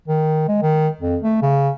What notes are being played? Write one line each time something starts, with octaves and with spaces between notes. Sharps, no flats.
D#3
G#3
D#3
F2
A3
C#3